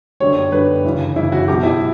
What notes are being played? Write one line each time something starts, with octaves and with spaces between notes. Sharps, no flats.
G1 F#2 D3 G3 C#5
G1 F#2 D3 G3 B4
G1 F#2 C#3 E3
G1 F#2 C#3 E3 E4
F#4
B1 B2 F#3 G4
E4